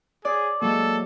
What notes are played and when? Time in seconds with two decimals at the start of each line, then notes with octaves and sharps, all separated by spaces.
0.25 G#4 D5
0.62 F#3 G#3 A#3 A4